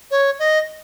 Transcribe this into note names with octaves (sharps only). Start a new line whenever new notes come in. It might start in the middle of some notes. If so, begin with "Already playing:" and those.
C#5
D#5